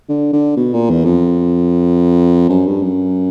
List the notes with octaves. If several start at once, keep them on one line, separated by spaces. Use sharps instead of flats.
D3
D3
B2
A#2
E2
F2
F#2
G2
F#2